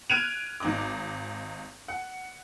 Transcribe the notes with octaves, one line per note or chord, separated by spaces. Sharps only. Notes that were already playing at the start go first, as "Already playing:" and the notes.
F6 F#6 G#6 D7 D#7 F7
G#1 D#4 D6
F#5